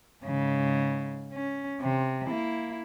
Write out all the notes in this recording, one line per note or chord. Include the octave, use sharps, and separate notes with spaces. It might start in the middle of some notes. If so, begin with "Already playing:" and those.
G#2 C#3
C#4
C3
A#3 E4